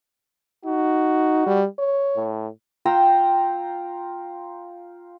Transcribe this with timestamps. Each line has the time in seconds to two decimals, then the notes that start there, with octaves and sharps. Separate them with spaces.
0.65 D#4 F#4
1.46 G3
1.79 C#5
2.16 A2
2.85 F4 G5 A#5 E6